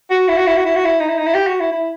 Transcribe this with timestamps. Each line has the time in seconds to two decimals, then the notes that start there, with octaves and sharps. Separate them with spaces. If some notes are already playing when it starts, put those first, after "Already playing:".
0.10 F#4
0.28 E4
0.37 F#4
0.47 E4
0.56 F#4
0.66 E4
0.76 F#4
0.85 E4
1.00 D#4
1.08 E4
1.18 D#4
1.26 E4
1.35 G4
1.47 F#4
1.60 E4
1.71 E4